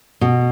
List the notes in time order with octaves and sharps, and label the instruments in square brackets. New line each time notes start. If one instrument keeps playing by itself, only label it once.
[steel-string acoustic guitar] B2